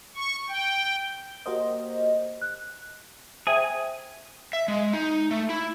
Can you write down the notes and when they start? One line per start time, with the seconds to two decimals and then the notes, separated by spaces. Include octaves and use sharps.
0.15 C#6
0.49 G5
1.46 A#3 F#4 G4 A#4 C5 D#5
2.42 F#6
3.47 G#4 C5 E5 G5 G#5
4.53 E5
4.68 G#3
4.93 D#4
5.31 A3
5.49 E4